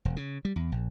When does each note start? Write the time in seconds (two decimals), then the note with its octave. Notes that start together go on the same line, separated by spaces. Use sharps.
0.05 E1
0.16 C#3
0.45 G3
0.56 E2
0.72 A#1